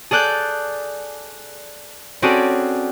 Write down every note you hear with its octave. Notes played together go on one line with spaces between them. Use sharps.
G#4 A4 D5 F#6 G6
C4 C#4 F#4 G#4 A4 D5